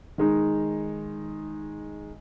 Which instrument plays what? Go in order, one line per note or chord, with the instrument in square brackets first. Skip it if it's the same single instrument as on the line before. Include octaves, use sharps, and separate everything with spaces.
[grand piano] D#3 G#3 D#4